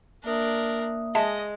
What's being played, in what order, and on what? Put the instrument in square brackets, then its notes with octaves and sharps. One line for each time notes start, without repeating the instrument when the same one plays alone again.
[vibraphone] A#3 E5 D#6 [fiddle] D4 A#4
[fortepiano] G#3 [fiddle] D#5 [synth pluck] E5 A5